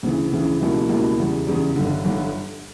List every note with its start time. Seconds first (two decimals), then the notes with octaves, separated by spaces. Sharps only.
0.03 D2 C#3 E3
0.32 D2 C#3 E3
0.60 C#2 B2 G3 A#3 E4
0.89 C#2 B2 G3 A#3 E4
1.18 E2 C#3 G3
1.47 E2 C#3 G3
1.76 G1 G2 D3
2.05 G1 G2 D3